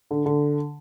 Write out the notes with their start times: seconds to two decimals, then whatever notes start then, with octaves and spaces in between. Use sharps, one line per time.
0.11 D3
0.26 D3